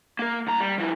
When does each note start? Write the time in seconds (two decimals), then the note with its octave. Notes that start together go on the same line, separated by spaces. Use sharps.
0.19 A#3 A#4
0.47 C2 A#5
0.60 G3
0.78 F3 E4